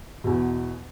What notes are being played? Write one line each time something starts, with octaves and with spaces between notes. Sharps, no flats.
E2 B2